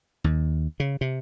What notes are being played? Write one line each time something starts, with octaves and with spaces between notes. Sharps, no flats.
D#2
C#3
C3